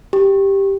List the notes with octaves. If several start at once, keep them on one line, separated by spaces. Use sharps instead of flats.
G4